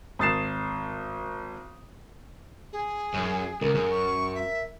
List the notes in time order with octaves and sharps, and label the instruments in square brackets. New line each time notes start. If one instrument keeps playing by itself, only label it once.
[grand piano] G#1 D#6 A6 C7 E7
[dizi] G#4
[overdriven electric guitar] F#2
[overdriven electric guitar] C#2 [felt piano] A#4
[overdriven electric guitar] F#2 [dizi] G#4
[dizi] C#6
E5